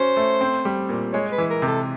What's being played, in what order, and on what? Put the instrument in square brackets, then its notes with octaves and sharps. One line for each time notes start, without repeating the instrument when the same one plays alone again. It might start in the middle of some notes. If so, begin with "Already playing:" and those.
Already playing: [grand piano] C#4 F#4 [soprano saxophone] C5
[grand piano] A3
C4
G3
A#2
[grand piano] G#3 [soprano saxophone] C#5
[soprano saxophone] B4
[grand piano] E3
[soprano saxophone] A#4
[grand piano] C3
[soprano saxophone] A4